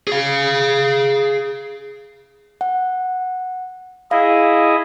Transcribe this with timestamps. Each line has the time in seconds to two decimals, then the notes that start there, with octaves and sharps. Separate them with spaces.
0.07 G#4 F5
2.61 F#5
4.11 E4 G#4 D#5 F5